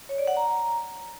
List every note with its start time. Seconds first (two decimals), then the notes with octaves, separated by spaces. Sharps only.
0.09 C#5
0.18 D5
0.27 F#5
0.37 A#5